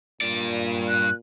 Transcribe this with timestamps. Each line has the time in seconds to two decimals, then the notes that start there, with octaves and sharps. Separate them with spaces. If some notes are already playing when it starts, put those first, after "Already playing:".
0.21 G2 A#2 D5
0.89 F#6